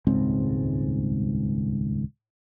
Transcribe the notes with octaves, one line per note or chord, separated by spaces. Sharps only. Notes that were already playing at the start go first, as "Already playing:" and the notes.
D#1 C#2 G#2 C4